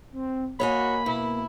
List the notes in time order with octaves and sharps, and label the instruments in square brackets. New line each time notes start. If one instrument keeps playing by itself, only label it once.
[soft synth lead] C4
[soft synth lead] A#3 [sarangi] F#4 [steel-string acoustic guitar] C#5 D#5 G#5 [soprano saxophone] B5
[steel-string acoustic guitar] B2 [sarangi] E4